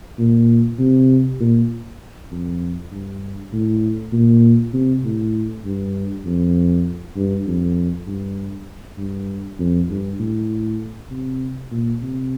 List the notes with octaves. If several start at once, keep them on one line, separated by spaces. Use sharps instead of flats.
A#2
C3
A#2
F2
G2
A2
A#2
C3
A2
G2
F2
G2
F2
G2
G2
F2
G2
A2
C3
A#2
C3